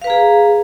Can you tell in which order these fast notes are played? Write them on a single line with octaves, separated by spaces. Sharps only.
F5 B4 A#5 G#4